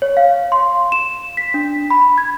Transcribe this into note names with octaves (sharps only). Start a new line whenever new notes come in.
C#5
F5
C6
E7
B6
D4
B5
G#6